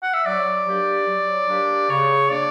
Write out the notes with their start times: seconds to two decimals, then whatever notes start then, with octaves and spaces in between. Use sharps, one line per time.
0.03 F#5
0.14 E5
0.26 F#3 D5
0.67 A#3 D4 G4
1.07 F#3
1.49 A#3 D4 G4
1.89 C#3 C#5
2.30 F#3 A#3 D4 D5